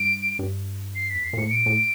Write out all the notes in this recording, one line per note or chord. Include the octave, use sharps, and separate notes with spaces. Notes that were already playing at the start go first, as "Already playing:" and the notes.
Already playing: G2 D7
G2
C7
E2 B6
F2 C7
A#2
A2 C#7
A#2 D7
A2